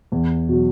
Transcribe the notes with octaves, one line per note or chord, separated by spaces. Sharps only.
E2
B2 F#3